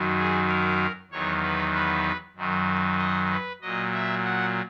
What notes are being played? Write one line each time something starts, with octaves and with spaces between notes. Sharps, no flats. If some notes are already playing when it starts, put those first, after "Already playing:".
Already playing: F#2 D#3 F#3
G#4
A#4
E2 D#3 F#3 C#5
B4
B4
F#2 D#3 F#3
D#5
B4
A#2 F#3 D#5
E5
F#5